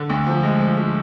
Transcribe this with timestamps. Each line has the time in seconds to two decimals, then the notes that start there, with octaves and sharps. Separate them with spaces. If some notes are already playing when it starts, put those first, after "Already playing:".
Already playing: D3
0.10 D2
0.27 F3
0.43 G#3
0.60 F3
0.78 F3